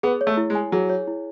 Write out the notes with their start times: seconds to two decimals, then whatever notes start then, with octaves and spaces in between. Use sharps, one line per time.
0.03 B3 G#4
0.21 C#5
0.27 A3
0.37 E4
0.50 G#3
0.55 G#5
0.72 F#3 G#4
0.90 C#5
1.07 E4